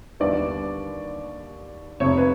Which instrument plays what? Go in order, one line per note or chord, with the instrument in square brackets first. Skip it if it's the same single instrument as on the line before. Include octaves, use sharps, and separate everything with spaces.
[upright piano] D#2 D3 G3 B3 D4 D5
F1 F2 C3 F3 C#5
B4